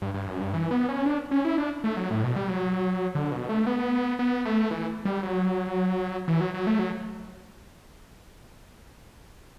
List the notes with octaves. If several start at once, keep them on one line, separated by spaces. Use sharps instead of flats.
G2
G2
F#2
G2
E3
B3
C#4
D4
C#4
E4
D4
A3
F#3
A2
B2
G3
F#3
D3
B2
A3
B3
B3
A3
E3
G3
F#3
E3
F#3
F#3
A3
F#3